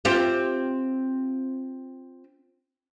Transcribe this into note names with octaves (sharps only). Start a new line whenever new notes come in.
C4 F4 G4